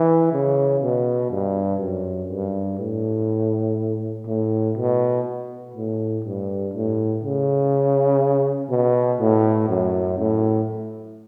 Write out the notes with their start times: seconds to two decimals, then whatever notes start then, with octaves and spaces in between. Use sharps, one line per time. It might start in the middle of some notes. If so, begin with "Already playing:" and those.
Already playing: E3
0.33 C#3
0.82 B2
1.31 G2
1.80 F#2
2.30 G2
2.79 A2
4.27 A2
4.76 B2
5.75 A2
6.24 G2
6.74 A2
7.23 C#3
8.70 B2
9.20 A2
9.69 F#2
10.18 A2